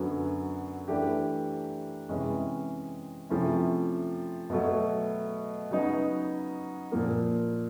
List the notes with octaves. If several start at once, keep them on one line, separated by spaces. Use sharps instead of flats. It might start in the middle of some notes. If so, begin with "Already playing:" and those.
Already playing: F#2 D3 F#3 B3
E3 A3 D4 G4
C3 E3 G#3 C#4
C3 F3 A3 C#4 E4
B2 F#3 A3
C#3 F#3 B3 D#4 F#4
A#2 F3 A#3